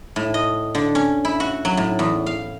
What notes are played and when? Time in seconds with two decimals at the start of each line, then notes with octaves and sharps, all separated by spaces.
0.16 A2
0.34 D#5
0.75 D3
0.95 C#4
1.25 E4
1.40 F#4
1.65 F#3
1.77 A2
1.99 E2
2.26 F5